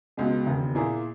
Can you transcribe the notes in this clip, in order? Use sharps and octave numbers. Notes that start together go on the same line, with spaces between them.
C#2 B2 G#3
E1 D#2 C#3
A#2 A#3 E4 G#4